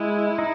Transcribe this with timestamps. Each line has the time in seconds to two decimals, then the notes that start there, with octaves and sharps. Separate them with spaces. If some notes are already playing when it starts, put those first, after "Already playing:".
Already playing: G#3 E4
0.39 D#4